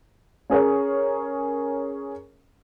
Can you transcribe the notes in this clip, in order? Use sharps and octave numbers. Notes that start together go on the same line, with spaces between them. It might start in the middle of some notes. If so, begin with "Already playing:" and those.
C#4 G#4 A#4 C#5